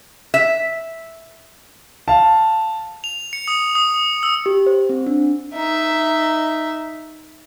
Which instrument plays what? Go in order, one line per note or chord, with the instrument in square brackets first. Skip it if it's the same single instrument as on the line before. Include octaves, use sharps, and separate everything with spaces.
[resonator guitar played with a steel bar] E5
[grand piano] F5 A5
[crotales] F7
C#7
D#6
D#6
E6
[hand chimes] G4
C5
C4
D4
[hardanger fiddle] D#4 E5